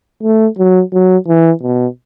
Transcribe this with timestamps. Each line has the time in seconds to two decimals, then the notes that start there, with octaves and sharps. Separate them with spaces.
0.23 A3
0.58 F#3
0.93 F#3
1.27 E3
1.63 B2